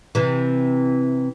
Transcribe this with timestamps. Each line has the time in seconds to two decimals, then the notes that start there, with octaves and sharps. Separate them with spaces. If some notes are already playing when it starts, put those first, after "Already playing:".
0.15 C3 E3